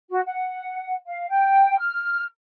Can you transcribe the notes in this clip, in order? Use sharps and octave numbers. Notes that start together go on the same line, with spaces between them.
F#4
F#5
F5
G5
F6